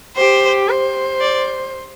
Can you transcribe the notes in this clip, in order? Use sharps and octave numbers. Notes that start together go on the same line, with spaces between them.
G4 C5
C5
D5